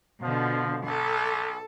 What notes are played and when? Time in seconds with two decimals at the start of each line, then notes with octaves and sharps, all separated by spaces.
0.22 B2 D3 F3
0.86 B1 A4